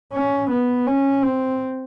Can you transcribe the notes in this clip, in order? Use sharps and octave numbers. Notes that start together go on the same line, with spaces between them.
C#4
B3
C#4
C4